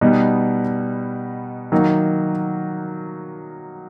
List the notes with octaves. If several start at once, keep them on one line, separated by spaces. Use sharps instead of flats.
B2 G3 B3 D#4
D#3 F#3 A#3 D#4